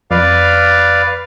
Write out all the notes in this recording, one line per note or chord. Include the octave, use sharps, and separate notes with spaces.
F2 B4 D5 F5